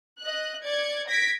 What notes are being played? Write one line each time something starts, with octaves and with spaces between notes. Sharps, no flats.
D#5 F#6
D5 G#6 C#7
G#6 A#6 B6 D7